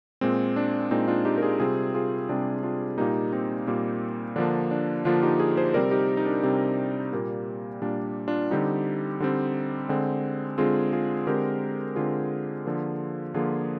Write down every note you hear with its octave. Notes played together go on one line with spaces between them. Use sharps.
A#2 G#3 C4
D4
A#2 G#3 C4 D#4
D4 F4
D#4 G4
A#4
F4 G#4
C3 G3 C4 F4 G#4
F4 G#4
C3 G3 C4 D4
D4 F4
A#2 G3 A#3 D#4 G4
C4 D#4
A#2 G3 A#3
D3 F3 A#3 D4
D4
D3 F3 A#3 D4 F4
D#4 G4
F4 G#4
G#4 C5
C3 G3 C4 A#4 D5
D#4 G4
D#4
D4
C3 G3 C4
A#2 G3 A#3
A#2 G3 A#3 D4
D4 F4
D3 G3 C4 D#4 G4
D3 G3 C4
D3 G#3 C4
D3 G#3 C4 F4 G#4
F4 G#4
D3 G#3 C4 G4 A#4
D3 G#3 C4 F4 G#4
D3 F3 A#3
D3 F3 A#3 F4 G#4